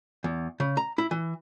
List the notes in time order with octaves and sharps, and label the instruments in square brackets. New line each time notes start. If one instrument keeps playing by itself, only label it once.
[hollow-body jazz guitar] E2
C#3
A#5
E4
E3